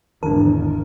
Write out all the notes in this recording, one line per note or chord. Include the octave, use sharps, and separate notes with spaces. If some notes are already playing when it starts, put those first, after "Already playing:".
G#1 E2 D3 E3 D4 A#4 A5